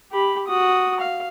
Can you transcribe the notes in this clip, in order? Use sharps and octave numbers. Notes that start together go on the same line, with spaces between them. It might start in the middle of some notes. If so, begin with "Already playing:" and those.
G4 B5
F#4 D#6
F5